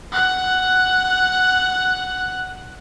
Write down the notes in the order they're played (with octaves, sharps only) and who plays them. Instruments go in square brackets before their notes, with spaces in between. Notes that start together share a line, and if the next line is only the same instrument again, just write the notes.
[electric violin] F#5 F#6